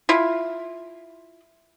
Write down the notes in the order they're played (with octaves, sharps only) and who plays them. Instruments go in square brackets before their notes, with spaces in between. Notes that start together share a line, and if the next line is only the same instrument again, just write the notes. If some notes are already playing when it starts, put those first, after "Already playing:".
[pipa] E4 F4